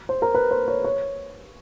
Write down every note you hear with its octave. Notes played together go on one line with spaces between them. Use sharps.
C5
A#4
B4
C5
C#5
C#5